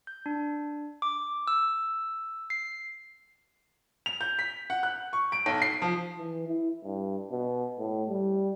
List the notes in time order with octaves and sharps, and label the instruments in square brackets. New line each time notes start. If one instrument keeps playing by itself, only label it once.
[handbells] G6
D4
D6
E6
C7
[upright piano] F7
G6
B6
F#5
F#6
C#6
D7
B1
C7
F3
[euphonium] E3
E4
G2
B2
A2
G3